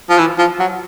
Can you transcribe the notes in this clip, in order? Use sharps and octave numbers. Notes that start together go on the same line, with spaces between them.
F3
E3
F3
F#3